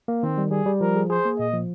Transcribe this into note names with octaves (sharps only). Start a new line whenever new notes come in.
A#3
D#3 C4
G3
G3 G#4
G3
F3 A#4
G#4
G#4 C5
A#3
A#2 D#5
F3